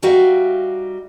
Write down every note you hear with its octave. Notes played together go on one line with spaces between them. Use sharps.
G3 D#4 F#4 E5 F5